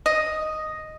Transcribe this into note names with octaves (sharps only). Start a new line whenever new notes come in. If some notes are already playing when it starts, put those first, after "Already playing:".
D#5